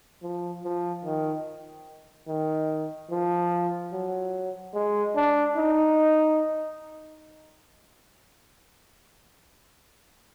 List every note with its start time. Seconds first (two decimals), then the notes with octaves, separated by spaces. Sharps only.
0.23 F3
0.64 F3
1.05 D#3
2.28 D#3
3.10 F3
3.93 F#3
4.74 G#3
5.16 D4
5.56 D#4